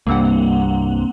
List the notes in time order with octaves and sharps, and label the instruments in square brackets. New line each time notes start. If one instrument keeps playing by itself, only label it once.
[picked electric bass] C2 G2 [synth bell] A#3 C4 F#5